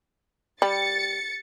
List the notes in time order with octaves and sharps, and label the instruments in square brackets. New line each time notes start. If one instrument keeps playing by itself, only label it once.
[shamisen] G3 [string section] A6 C#7